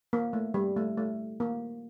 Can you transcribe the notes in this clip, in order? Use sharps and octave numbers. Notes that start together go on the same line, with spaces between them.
A#3
A3
G3
A3
A3
A#3